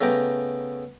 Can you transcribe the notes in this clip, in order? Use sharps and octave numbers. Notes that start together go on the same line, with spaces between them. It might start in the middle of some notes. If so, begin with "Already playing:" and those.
C#3 A3 B3 G5 A#5 D6